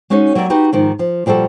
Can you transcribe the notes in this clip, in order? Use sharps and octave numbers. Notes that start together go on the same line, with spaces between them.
G#3 C#4 D#4 F#4 C#5
F#3 A#3 G4 D5 E5 F5
D#4 F#4 G4 B4
G#2 D#3 F3
F3
A#2 F3 G3 F#4 A4